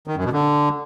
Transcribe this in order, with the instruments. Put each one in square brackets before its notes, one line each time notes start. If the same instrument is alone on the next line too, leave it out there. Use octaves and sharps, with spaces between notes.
[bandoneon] D#3
F#2
B2
D3